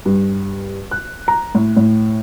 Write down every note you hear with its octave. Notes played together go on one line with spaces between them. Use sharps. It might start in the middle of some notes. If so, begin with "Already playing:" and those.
G2
F#6
A#5
A2
A2